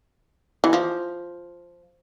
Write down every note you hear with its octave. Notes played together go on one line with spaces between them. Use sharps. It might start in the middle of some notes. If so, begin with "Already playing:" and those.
E3
F3